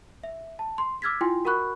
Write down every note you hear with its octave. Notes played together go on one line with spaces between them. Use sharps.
E5
A5
C6
D6 E6 F6 G#6 A6 B6
E4 F4 G5 G#5 C6
F#4 A#4 F#5 B5 C#6 F#6